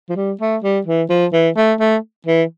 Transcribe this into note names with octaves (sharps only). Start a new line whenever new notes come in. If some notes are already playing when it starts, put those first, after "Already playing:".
F3
G3
A3
G3
E3
F3
E3
A3
A3
E3